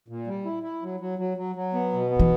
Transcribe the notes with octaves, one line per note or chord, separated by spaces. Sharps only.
A#2
G3
E4
E4
F#3
F#3
F#3
F#3
F#3
B3
B2
B3
E3